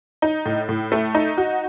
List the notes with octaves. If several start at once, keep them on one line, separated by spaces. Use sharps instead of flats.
D#4
A2
A2
A3
D#4
F#4